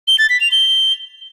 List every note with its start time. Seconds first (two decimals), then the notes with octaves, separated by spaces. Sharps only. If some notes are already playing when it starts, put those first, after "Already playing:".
0.08 G7
0.19 A6
0.30 B6
0.40 F7
0.51 G7